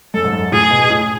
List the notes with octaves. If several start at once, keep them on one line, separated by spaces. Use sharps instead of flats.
F#2 A4
G#2
F#2
A2 G#4
B2
A2